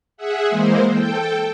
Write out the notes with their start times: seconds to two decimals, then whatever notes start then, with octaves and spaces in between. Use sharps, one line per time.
0.17 G#4 E5 F#5
0.49 E3 G#3 A#3 C5
0.91 A4 G5